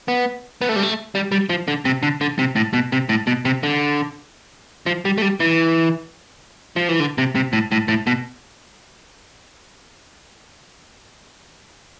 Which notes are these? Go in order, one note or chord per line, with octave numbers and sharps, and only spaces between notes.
B3
B3
A3
G3
A3
G3
G3
F3
D3
C3
D3
D3
C3
A2
B2
C3
A2
B2
C3
D3
F3
G3
A3
G3
E3
F3
E3
D3
C3
C3
A2
A2
A2
B2